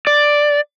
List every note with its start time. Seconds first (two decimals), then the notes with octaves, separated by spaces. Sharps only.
0.07 D5